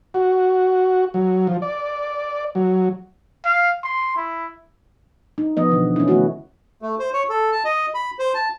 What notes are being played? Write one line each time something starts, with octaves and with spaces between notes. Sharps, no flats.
F#4
F#3
F3
D5
F#3
F5
C6
E4
D#4
F3 B3 D#5
B2 D3 E3
C#4 E4
D3 D#3 A3 B3 E4 F#4
A3
C5
C#5
A4
A5
D#5
B5
C5
A5